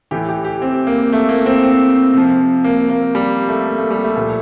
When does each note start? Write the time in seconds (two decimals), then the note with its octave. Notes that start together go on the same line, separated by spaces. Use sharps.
0.11 A2 E3 G4
0.28 G4
0.44 G4
0.62 C4
0.87 A#3
1.13 A3
1.29 A#3
1.46 C4
1.63 C4
2.13 C3 F3
2.64 A#3
2.90 A#3
3.15 G3
3.48 A3
3.66 A#3
3.78 A3
3.91 G3
4.03 A3
4.16 A#2 F3